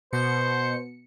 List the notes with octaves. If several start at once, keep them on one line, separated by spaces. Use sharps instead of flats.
B2 C5 C#7